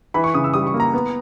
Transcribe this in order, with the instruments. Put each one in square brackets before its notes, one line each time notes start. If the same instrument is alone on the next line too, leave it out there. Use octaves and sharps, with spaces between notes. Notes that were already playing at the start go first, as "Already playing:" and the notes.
[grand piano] E3 B5
C#6
C#3 D#6
E6
G3 D#6
C#6
A#3
A#5
B3